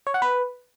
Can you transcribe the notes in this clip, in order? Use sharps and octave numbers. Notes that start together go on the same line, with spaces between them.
C#5
F#5
B4